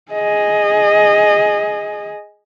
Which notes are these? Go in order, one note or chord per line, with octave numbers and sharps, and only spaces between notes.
G#4 D#5